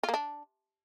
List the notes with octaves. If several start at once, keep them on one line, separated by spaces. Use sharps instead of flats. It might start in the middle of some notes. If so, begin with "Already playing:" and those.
F4
A#3
D4